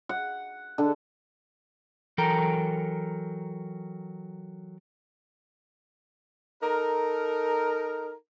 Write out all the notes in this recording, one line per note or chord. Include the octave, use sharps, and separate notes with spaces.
F#5
D3
E3 F#3 A4 A#4 G5 A#5
D#4 A4 A#4